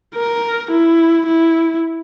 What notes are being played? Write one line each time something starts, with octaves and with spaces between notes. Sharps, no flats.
A#4
E4
E4